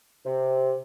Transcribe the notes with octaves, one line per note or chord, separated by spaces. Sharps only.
C3